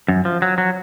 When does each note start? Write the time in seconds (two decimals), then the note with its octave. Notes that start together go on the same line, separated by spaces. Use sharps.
0.08 F#2
0.25 F3
0.42 F#3
0.58 F#3